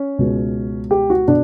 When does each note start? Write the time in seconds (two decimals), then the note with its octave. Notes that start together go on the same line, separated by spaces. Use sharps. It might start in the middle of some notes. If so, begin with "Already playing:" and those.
Already playing: C#4
0.19 C#2 B2
0.91 G4
1.10 F#4
1.28 B2 D4